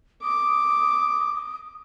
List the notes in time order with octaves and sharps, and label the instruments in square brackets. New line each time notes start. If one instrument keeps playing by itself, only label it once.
[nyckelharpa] D6 [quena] D#6